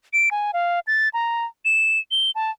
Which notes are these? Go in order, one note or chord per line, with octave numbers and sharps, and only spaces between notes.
D7
G#5
F5
A6
A#5
E7
G7
A5